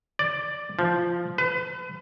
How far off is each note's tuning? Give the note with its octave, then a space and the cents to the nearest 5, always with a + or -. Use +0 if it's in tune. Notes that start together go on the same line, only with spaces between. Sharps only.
D5 +5
F3 -5
B4 +35